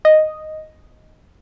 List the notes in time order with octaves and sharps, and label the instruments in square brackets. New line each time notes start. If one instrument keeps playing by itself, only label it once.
[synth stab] D#5